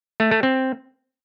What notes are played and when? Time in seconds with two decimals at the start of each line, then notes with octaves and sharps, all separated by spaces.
0.20 A3
0.31 A3
0.43 C4